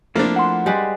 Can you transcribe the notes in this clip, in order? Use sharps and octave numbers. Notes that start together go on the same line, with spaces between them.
F3 A3 A#3 C4 D4 E4
F#5 C6
G3 G#3 B4